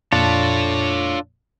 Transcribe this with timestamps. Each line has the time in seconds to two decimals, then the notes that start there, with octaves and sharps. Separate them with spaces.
0.13 F2 A#2 D4 F4 A4 C#5 A5